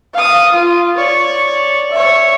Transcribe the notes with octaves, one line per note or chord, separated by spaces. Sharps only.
F5 D#6
F4
C#5 D5
C#5 E5